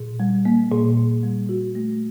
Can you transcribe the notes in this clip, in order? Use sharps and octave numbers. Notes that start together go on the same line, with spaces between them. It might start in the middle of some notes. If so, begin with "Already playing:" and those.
Already playing: A#2
G3
A#3
A#2
A#2
G3
F#4
A3